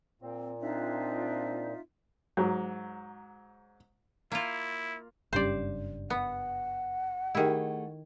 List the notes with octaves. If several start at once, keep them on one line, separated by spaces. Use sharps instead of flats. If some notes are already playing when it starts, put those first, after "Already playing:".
A#2 C4
C4 D4 D#4 F4 E5
G#2 F#3
A#3 E4 F4
F#1 G2 C#4 G4 C5 D5 F5
B3 F#5
D#3 A3 E4 G4 G#4